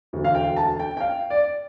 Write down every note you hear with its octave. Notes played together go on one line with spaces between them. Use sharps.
E1 D2 D3
F5
G5
A5
G5
G5
F5
D5